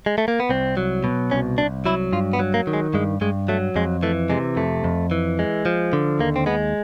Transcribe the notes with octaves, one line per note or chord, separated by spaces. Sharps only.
G#3
A3
A#3
B3
C2 C4
F#3
B2
C2 C#4
C2 D4
F#3 E4
G2 F4
B3
F#3
A#3
D#3
G#3
G2 G#3
G2 G#3
F#3 A3
F2 G#3
E3 A3
C3 G#3
F2 A3
F2
E3
G#3
F3
D3
D#2 A#3
C4
G#3 B3